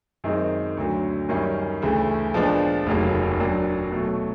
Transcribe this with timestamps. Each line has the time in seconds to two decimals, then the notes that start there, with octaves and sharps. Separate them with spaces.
0.24 F#2 D#3 G#3 C4 D#4
0.77 D2 D3 F#3
1.29 F#2 D#3 G3 A#3 C#4
1.82 D2 C#3 E3 A3
2.34 A#2 F3 G#3 B3 D4
2.86 F1 D#2 C#3 F#3 A#3
3.40 A#2 F#3 A#3 D4
3.92 B2 F#3 A3